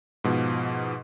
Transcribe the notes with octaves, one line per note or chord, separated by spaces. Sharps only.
G#2 B2 F3